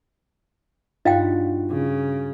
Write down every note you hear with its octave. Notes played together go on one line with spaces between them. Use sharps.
G2 D#4 F4 F#4 D#5 F5 G5
C#3